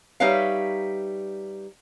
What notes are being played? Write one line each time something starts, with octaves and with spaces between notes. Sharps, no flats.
G3 D#4 B4 C#5 E5 F5